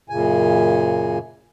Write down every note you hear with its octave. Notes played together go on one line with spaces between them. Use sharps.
F#2 A#2 C#3 G#5